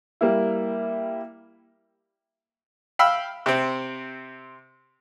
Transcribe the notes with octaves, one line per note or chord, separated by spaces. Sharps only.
G3 A#3 E4
F5 G5 B5 E6
C3 C4